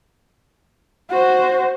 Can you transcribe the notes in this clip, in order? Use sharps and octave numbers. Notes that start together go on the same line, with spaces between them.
F#4 C5